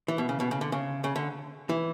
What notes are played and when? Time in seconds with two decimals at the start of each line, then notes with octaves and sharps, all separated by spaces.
0.08 E3
0.18 B2
0.29 C#3
0.40 B2
0.51 C#3
0.61 D3
0.72 C#3
1.04 C#3
1.16 D3
1.69 E3